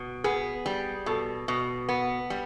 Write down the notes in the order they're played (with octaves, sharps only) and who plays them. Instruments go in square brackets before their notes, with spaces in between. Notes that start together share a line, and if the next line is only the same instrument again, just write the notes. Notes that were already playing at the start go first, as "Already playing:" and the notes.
Already playing: [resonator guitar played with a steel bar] B2
[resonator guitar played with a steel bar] B3 [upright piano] G#4
[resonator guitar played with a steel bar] G3
[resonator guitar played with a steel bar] B2 [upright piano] A4
[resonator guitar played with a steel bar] B2
B3
G3